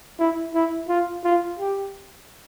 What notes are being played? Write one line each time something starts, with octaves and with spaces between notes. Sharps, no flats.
E4
E4
F4
F4
G4